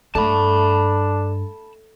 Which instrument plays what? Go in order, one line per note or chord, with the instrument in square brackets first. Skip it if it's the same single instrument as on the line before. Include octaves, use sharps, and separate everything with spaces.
[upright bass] G2 [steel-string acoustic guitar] A3 [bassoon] D4 [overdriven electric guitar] A5 B5